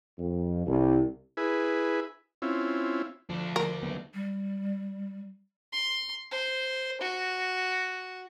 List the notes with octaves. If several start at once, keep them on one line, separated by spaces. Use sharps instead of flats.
F2
C2
E4 G#4 B4
C4 C#4 E4 F4
D2 F3 D4
A#4
D#2 F#3 B3
G3
C6
C5
F#4